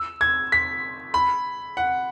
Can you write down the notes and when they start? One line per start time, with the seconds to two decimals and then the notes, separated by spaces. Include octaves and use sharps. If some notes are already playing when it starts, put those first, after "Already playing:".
Already playing: E6
0.21 G#6
0.52 B6
1.14 B5
1.77 F#5